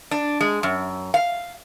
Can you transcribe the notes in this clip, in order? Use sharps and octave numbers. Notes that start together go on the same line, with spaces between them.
D4
G#3
F#2
F5